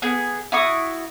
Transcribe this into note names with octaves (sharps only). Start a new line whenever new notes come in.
B3 G#4
E4 F#4 C#6 D#6